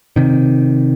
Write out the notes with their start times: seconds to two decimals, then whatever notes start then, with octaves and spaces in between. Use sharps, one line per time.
0.16 C3 D#3